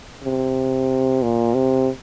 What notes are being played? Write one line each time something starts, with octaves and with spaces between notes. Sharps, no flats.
C3
A#2
C3